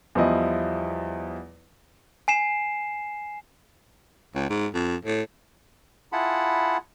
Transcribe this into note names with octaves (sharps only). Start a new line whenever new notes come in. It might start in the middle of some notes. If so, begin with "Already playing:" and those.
E2 F3 G3 E4 D#5
G#5 C7 E7
C#2
G#2
F2
A2
E4 F4 G#4 F#5 A5 B5